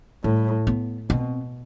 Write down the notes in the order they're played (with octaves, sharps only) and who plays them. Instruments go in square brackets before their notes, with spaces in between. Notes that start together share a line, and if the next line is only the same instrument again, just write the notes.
[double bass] A2 [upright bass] G3
[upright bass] B3
[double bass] B2 [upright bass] C4